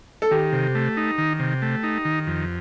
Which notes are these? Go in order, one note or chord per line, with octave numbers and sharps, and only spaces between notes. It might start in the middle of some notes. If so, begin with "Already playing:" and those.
A4
D#3 G4
C3
A3
D#4
D#3
C3
A3
D#4
D#3
F2